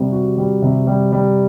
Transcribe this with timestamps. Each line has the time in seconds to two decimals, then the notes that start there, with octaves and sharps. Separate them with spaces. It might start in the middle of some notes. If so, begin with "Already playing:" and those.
Already playing: C3 G3
0.12 F#4
0.37 G3
0.62 C3
0.87 G3
1.12 G3